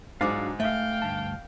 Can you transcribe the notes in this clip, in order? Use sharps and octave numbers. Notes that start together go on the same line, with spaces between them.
G#2 F#3 D4 F4 G#4 F5
A3 E5 F5 G5
D2 G2 A5